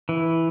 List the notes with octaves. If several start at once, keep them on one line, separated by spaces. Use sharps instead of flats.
E3